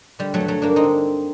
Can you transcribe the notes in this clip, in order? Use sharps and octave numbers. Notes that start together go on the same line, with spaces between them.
D3 G3
F#3 A3
G2
F#3 A3
G2 A#3 D4
C4 D#4
D3